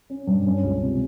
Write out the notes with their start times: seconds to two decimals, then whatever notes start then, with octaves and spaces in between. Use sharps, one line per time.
0.10 C#4
0.27 G2
0.46 C#4
0.63 C#2
0.82 C3